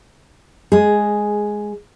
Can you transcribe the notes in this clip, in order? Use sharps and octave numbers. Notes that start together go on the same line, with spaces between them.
G#3 G#4